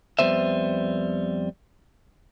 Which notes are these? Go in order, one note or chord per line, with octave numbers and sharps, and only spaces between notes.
F2 G#2 G3 B3 C5 E5